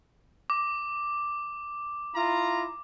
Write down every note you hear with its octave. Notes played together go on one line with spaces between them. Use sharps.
D6
E4 F4 A#5